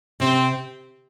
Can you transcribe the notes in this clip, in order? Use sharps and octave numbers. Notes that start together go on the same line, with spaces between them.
C3 C4